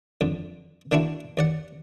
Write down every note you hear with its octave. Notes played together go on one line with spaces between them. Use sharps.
F2 D3
D3 A#3 D4 E4 F#4
D#2 D5 F#5